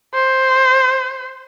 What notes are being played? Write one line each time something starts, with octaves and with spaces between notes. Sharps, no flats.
C5